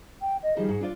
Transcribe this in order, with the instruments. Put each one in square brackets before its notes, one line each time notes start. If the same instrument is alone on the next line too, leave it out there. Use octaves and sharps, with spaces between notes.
[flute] G5
D#5
[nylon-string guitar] D#3 F3 G3 [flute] G#4
[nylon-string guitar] G#2 F#4
D4 F4 D5